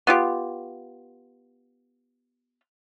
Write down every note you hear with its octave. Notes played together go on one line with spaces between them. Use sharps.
B3 F4 G4